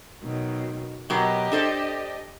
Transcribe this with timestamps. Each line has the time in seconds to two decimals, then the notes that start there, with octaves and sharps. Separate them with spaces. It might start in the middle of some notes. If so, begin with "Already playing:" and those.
0.22 B2 D#3 F#3
1.10 B2 F#3 G4 A#4 D#5
1.52 D4 A4 C5